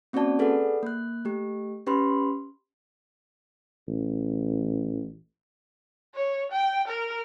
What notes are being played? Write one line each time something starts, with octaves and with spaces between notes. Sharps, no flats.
A#3 C4 C#4 F#4 D5 A5
G#4 A4 B4 D5 F#5
A#3 F#6
A3 G4
C#4 G4 B4 B5 C6
A1
C#5
G5
A#4